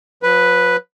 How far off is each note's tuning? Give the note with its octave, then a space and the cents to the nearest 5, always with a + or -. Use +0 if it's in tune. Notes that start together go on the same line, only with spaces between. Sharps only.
F3 +45 B4 +0